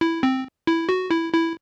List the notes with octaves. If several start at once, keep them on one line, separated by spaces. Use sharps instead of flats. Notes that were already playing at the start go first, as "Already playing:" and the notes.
E4
C4
E4
F#4
E4
E4